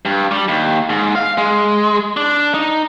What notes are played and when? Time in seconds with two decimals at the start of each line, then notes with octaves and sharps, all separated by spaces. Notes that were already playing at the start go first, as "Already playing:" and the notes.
0.05 G2
0.31 G3
0.48 D#2
0.90 G#2
1.16 F5
1.38 G#3
2.17 D4
2.54 D#4